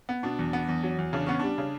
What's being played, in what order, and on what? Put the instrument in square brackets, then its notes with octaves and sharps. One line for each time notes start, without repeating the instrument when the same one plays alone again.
[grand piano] B3
[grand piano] B2 [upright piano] D4
[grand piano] E2
B3
E2
F#3
E2
[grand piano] C#3 [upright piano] D4
[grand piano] B3 [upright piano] C#4
[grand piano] G3 [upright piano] D4
[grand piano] C#3